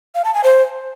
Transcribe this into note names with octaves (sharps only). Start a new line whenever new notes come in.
F5
A5
G#5
C5